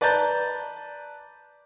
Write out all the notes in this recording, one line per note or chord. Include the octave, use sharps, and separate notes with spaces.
B4 D5 A5 A#5 G6 A6